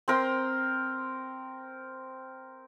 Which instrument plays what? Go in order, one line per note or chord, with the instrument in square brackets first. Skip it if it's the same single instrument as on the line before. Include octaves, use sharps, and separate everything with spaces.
[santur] C4 A#4 C6